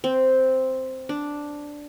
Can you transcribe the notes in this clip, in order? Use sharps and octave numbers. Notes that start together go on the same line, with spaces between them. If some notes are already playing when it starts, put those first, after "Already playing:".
C4
D4